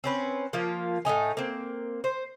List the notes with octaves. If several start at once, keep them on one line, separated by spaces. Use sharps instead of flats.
C4 C#4 B4
F3 A#3 F4
A2 A3 D#4 G#5
A#3 C4
C5